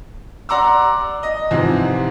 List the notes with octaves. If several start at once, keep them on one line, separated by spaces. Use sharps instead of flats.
D5 F#5 A#5 C6 D6 E6
D#5
G#2 C3 E3 F3